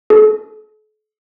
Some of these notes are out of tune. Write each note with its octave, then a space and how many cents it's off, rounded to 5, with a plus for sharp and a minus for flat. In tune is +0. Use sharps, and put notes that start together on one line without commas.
A4 -40